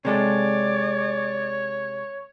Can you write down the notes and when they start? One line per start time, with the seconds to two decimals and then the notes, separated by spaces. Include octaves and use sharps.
0.05 C3 G#3 A4 C#5 D5